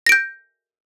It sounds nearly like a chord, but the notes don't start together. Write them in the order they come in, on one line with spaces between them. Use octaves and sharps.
A#6 D7 G6